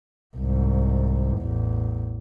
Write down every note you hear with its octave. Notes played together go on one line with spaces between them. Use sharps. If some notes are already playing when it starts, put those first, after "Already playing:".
C2 G#2
A1 E2